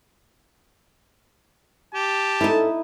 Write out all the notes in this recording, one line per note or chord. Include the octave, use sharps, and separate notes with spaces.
G4 A5
G2 C#4 D#4 E4 A4